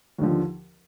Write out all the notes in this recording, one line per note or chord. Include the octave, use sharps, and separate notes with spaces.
D#2 D3 F3